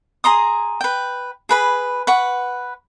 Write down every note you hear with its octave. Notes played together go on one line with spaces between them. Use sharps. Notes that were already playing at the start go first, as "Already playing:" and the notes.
G#4 A#5 C6 D#6
B4 G5
G#4 B4 B5
B4 F#5 C#6